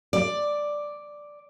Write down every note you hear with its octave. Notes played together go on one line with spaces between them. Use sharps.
D5